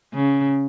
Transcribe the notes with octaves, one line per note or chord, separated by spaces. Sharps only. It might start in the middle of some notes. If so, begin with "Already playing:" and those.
C#3